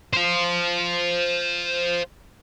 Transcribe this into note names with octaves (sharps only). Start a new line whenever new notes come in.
C5 F5